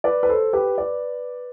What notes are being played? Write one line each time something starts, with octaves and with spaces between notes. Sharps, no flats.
B4 D5
B4
A4 C5
G4 B4
B4 D5